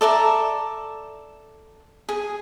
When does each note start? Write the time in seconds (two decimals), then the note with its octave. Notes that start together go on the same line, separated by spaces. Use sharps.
0.01 A4 D5 E5 A#5
2.09 G#4